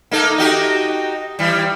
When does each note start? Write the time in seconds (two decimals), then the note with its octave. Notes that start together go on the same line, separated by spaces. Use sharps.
0.11 A#3 D#4 A4
0.38 D#4 F#4 G4
1.39 E3 G3